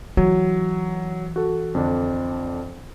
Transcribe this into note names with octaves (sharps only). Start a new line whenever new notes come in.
E3 F#3
F#4 A4
F2 D3 D4